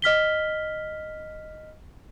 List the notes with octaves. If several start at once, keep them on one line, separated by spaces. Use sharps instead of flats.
D#5 F6 B6 G7